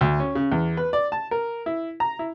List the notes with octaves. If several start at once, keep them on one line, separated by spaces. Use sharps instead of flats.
D2
C#4
C#3
E2
B4
D5
A5
A#4
E4
A#5
E4